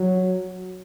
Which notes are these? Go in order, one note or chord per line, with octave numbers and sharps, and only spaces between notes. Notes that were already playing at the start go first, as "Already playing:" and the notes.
Already playing: F#3